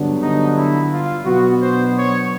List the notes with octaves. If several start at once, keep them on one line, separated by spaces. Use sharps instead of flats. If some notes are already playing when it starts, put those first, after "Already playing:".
Already playing: G2 D3 F#3 B3 D4
D#4
E4
F4
B2 F#3 B3 D4 F#4
C5
C#5